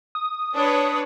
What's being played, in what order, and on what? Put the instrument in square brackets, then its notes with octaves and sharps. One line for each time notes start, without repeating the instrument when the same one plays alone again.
[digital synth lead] D#6
[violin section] D4 B4 C#5